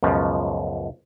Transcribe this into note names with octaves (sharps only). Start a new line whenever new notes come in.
C#2 F#2 B2 F3